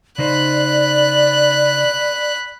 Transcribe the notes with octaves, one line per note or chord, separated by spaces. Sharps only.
C#3 D#4 C5 D5 B5 F#6